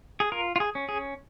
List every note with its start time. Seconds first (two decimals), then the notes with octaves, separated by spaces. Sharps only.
0.20 G#4
0.32 F4 A#4
0.56 F4
0.60 G#4
0.75 C#4
0.89 G#4